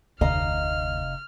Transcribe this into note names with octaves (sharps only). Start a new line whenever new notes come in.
F1 D2 C3 D#5 F5 A#5 F6